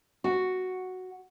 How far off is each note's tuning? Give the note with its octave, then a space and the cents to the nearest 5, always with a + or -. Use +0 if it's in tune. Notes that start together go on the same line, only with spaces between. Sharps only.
F#4 +0